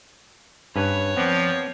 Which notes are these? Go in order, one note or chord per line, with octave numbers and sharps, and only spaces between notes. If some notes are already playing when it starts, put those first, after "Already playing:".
G2 C#4 B4 C#5
F3 B3 C4 D5